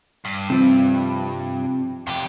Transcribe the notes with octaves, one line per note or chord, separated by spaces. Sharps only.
G2
C3 F3 C4
F2 G4